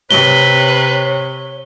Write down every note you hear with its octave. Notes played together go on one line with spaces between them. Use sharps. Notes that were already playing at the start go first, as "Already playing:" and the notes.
C3 B4 C#5 G7